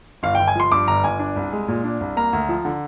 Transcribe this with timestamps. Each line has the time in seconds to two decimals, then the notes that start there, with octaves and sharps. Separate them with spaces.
0.23 G1 F5
0.35 G1 G5
0.48 G#5
0.55 F3 C6
0.72 G2 D6
0.88 G1 A#5
1.04 G1 G#5
1.19 D4
1.36 C2
1.52 G#3
1.68 A#2
1.84 D4
2.00 C2
2.17 A#3 A#5
2.33 D2
2.49 F3
2.65 D3